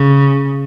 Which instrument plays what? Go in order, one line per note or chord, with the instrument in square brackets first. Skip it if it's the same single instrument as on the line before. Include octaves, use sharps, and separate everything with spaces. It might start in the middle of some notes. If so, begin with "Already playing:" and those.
Already playing: [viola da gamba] C#3